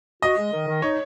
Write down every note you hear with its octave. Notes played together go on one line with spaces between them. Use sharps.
F#4 D#5
G#3
D#3
D#3
D#4 C#5